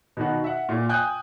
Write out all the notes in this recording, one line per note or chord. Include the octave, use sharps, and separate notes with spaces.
B2 D#3 F#4
E5 F#5
A#2
G5 G#5 D#6 F#6 G6